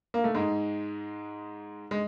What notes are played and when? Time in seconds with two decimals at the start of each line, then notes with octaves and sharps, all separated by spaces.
0.14 A#3
0.24 A3
0.35 G#2 G#3
1.91 G#3